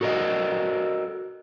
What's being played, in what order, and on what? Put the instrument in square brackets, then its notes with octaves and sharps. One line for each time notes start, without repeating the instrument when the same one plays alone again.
[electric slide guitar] F#4 A4 A#4 D5 D#5